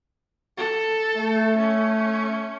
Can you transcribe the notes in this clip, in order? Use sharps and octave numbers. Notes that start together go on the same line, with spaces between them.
A4
A3
C#4